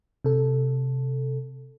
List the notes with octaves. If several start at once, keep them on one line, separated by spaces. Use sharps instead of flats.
C3 A4